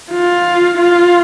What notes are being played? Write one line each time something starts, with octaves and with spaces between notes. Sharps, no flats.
F4
F4